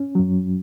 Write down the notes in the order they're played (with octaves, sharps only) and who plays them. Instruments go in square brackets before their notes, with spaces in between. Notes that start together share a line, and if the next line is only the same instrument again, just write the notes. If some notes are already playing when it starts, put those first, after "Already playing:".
Already playing: [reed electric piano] C#4
F#2 F#3